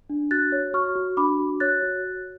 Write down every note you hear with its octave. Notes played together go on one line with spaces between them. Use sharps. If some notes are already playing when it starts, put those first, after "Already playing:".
D4
F#4 F#6 A6
C#5
F#4 C#6 F6
F#4
D4 B5 D6
F#4
C#5 F#6 A6
F#4
C#5